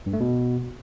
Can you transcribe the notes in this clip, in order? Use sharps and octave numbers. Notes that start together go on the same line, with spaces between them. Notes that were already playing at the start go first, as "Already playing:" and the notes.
G2
A3
B2